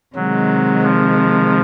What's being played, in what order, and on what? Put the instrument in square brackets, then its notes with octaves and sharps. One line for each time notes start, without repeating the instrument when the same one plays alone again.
[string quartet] C3 D#3 G#3 [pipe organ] F#3
[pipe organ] F3